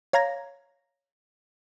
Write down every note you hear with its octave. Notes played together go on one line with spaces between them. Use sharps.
C#5 F5 A#5 G#6 A#6